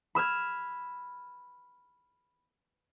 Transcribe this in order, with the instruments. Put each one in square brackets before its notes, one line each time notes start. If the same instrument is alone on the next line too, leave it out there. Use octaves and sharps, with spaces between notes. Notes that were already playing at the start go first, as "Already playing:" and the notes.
[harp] B5 E6 F6 G#6